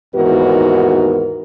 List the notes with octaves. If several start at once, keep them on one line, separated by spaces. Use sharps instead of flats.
D#2 G#2 E3 B3 F#4 A#4